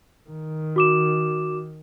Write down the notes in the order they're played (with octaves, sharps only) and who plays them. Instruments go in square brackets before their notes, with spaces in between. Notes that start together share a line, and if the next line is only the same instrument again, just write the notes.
[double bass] D#3
[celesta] F#4 D6 E7